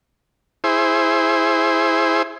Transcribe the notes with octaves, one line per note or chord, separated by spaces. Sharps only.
E4 G#4 C5